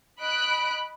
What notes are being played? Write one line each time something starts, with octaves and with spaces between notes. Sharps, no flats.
D#5 B5 F#6 D7